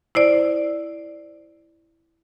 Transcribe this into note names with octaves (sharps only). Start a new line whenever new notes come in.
E4 C5 D5